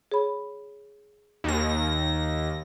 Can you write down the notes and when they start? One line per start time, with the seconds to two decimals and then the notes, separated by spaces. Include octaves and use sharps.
0.12 G#4 C#5 B5
1.44 D#2 A#6